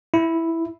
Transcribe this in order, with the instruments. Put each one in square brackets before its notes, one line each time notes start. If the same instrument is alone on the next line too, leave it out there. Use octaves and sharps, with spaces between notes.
[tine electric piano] E4